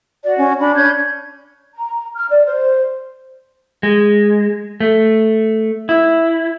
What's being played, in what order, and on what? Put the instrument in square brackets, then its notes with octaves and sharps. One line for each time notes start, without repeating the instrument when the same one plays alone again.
[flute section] F#4 [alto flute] D5
[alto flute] C#4
[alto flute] D4 [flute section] B5
[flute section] C#4 G6 G#6
A#5
F6
D5
C5
[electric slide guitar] G#3
A3
E4